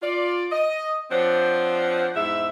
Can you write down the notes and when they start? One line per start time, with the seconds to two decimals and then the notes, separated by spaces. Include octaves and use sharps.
0.02 F4 D5
0.52 D#5
1.11 F3 C4 D4 C5 C#5 F#5
2.16 E2 G#2 E4 E5